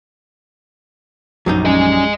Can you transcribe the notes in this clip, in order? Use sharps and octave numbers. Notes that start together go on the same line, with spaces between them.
A#1 F#2 F#3 G3 D#4
C#4 D#5 G#5